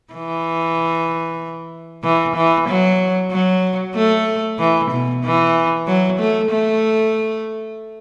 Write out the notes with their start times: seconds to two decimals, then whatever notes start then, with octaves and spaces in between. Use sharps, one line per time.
0.13 E3
2.04 E3
2.36 E3
2.68 F#3
3.31 F#3
3.95 A3
4.59 E3
4.91 B2
5.23 E3
5.87 F#3
6.19 A3
6.51 A3